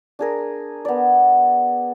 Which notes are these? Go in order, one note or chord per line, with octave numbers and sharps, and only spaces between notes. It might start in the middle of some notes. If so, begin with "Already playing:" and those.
D4 G#4 A#4
B3 D5